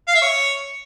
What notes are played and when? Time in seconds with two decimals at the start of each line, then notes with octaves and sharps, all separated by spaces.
0.08 F5
0.15 E5
0.22 C#5